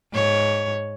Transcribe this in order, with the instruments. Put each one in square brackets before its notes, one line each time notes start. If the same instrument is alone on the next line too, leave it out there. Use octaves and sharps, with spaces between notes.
[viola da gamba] G#2 C#5